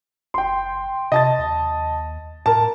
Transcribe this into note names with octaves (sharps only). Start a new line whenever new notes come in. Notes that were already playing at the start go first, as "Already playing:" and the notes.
F#1 G5 C6
C3 D#5 A5 A6
D#2
A2 A#4 A5